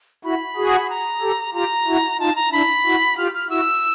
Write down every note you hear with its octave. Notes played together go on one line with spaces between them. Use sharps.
E4 F#4 B5
F#4 G#4
A#5
G4 A4
F4 G4 A#5
E4 F#4
D#4 F4 A5
A#5
D4 E4 B5
E4 F#4
F4 G4 F6
F6
E4 F#4 E6